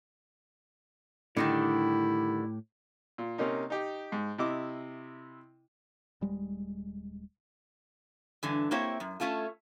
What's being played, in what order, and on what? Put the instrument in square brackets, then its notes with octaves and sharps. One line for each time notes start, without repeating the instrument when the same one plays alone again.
[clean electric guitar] A2 G4 [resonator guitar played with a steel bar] D3 D#3 G3 [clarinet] E4
[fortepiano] A#2
C3 A#3 C#4 D#4
D#4 G4
G#2
C3 E4 D#5 D6
[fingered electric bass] D#1 G3 G#3
[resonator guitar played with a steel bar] G2 D3 E3
A#3 C4 E4 G4 C#5
F#2
A3 C#4 F4 A4